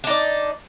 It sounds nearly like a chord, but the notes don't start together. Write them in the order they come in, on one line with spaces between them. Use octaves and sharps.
D4 D#4 D5